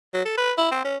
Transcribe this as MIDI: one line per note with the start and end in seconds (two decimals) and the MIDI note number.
0.14 0.23 54
0.25 0.38 69
0.38 0.52 71
0.58 0.69 64
0.72 0.83 60
0.85 0.97 61